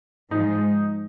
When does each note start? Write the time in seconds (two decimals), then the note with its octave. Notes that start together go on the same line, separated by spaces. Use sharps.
0.31 G#2 F3 G#3 D#4